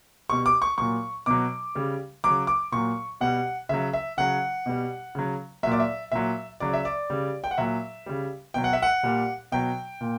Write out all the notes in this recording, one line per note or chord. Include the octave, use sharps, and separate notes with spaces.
B2 G3 C#6
D6
C#6
A#2 F#3 C#6
B2 F#3 D6
C#3 G3
C#3 F#3 D6
D6
A#2 F#3 C#6
B2 G3 F#5
C#3 F#3 E5
E5
C#3 F#3 F#5
B2 G3
C#3 F#3
A#2 F#3 E5
D5
E5
A#2 F#3 E5
C#3 F#3 D5
E5
D5
C#3 G3
G5
F#5
A#2 F#3 E5
C#3 G3
B2 F#3 G5
F#5
E5
F#5
A#2 G3
B2 F#3 G5
A#2